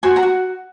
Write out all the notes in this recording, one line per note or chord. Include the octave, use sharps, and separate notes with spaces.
F#4 G#5 C6
F#5 A#5
F#4